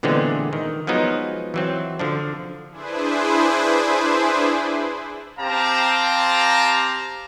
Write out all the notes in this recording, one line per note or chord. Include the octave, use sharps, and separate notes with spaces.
A#2 D3 E3 G#3 B3 C4
D#3
F3 F#3 G#3 B3 D#4
E3 F#3 C4
D3 F3 D4
D4 E4 G#4 B4 C5
C4 G4 F5 A5 A#5